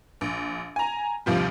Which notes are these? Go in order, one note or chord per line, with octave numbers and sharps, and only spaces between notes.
A#1
G#5 A#5
A#1 D#2 C3 F3 G3